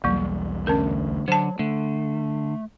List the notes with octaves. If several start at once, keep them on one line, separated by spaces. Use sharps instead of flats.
B1 E2 F#3 G3 A#3
D2 C#4 A#4
D3 F#3 C5 A5
D3 A3